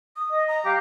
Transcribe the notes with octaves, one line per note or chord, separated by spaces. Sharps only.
D#6
D#5
A#5
G4 F5